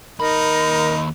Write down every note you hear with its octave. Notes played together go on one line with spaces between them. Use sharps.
D#2 D#4 A#4 B5